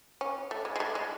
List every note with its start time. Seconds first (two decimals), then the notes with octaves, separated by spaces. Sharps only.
0.21 C#4
0.51 A3
0.65 G#3
0.76 G#3
0.80 A3
0.95 G#3